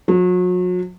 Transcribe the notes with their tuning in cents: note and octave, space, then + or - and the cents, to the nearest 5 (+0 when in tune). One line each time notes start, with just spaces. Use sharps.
F#3 -40